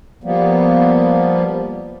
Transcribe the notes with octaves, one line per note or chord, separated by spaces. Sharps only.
F3 G3 A#3 B3